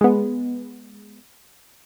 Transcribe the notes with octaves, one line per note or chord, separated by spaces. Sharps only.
G#3 B3